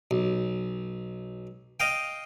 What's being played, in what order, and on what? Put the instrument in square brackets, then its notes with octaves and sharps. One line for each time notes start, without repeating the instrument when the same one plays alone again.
[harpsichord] B1
D#5 F5 G5